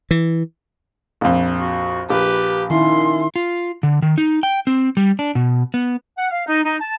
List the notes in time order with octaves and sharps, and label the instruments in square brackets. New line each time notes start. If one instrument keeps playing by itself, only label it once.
[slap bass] E3
[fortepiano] A#1 F2
[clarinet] F#4
[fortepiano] A#1 [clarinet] G4 [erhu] B4
[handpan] D#3 E4 [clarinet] C#4 [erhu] C6
[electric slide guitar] F4
D3
D#3
D#4
G5
C4
G3
D4
B2
B3
[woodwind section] F#5
F5
D#4
D#4
A5